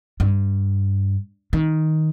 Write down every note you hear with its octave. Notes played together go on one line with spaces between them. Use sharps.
G2
D#3